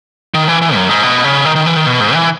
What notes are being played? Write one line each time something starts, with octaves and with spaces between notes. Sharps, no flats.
D#3
E3
E3
F#2
G#2
B2
C#3
D#3
D#3
E3
D#3
B2
G#2
E3